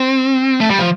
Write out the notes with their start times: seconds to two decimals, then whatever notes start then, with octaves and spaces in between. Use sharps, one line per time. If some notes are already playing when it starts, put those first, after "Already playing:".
Already playing: C4
0.60 A3
0.70 G3
0.79 F3